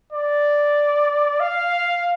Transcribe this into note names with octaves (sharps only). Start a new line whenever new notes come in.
D5
F5